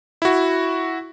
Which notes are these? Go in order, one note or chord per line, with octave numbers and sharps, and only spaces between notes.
E4 F#4